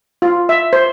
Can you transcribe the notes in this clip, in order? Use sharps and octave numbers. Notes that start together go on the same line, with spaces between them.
F4
E5
C5